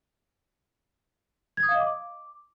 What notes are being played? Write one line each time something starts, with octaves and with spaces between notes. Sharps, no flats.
G#6
D#6
F5
D#5
D6